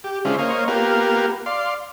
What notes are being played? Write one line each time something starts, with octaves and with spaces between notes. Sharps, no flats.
G4
D3 G#3 C#4 E4 F4 C5
A#3 C5 C#5 D#5 F5
A#3 B3 F4 G4 A#4
D5 F5 C6